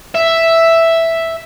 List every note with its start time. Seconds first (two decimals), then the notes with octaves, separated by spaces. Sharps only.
0.15 E5